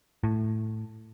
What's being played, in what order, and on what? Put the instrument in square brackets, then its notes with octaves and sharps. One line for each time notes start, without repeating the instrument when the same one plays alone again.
[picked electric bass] A2